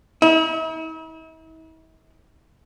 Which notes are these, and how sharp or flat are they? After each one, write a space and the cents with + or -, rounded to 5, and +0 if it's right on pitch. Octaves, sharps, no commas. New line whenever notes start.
E4 -45